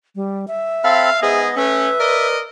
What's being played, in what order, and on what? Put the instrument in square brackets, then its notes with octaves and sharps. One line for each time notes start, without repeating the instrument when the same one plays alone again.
[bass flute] G3
E5
[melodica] C4 A4 B5 [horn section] F5
[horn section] G#2 G#4 [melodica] B3 D#5
[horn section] A3 C#4 [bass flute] B4 [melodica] E5
[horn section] A#4 D5 D#5